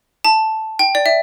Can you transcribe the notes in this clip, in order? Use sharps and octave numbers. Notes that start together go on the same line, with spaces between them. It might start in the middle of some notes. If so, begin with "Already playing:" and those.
A5
G5
D5
E5